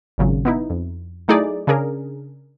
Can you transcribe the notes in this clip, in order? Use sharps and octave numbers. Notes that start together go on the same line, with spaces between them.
G#1 A#2 C#3 F#3
B3 D#4 E4
F2
F#3 A3 D#4 E4 G#4 D5
C#3 D4 G#4 A#4